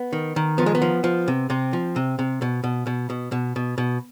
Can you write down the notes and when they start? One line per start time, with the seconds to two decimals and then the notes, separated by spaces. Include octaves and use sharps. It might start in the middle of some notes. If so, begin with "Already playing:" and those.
Already playing: B3
0.13 D#3
0.36 D#3
0.58 F3 B3
0.66 G#3
0.75 B3
0.82 F3
1.04 F3
1.28 C3
1.50 C3 C4
1.73 F3
1.96 C3
2.19 C3
2.42 B2
2.64 B2
2.87 B2
3.10 B2
3.32 B2
3.56 B2
3.78 B2